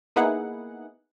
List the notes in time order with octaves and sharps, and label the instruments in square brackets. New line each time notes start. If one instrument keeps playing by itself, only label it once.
[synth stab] A#3 B3 D#4 E4 G#4 F#5